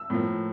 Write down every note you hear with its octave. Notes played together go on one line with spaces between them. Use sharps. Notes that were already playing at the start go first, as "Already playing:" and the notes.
Already playing: E6
A2 F3 A#3